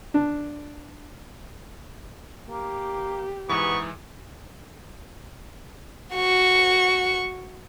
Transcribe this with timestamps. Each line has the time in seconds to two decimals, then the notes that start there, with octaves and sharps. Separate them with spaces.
0.14 D4
2.49 A#3 G4
3.49 G#2 E3 B3 D#4 B4 C#6
6.15 F#4 C#6